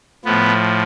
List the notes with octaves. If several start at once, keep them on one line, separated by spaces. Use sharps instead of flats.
A2 F3 B3